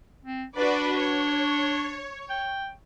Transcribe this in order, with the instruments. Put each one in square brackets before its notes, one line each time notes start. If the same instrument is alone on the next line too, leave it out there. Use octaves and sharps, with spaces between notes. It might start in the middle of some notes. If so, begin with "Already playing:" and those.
[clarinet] C4
[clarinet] D4 [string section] F#4 B4 D5
[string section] C#5
[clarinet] G5